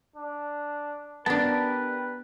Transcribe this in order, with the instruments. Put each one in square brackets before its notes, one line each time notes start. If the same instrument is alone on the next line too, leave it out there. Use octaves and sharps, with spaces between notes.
[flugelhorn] D4
[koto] B3 D4 [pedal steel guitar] G4 A#4 A5 [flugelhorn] B4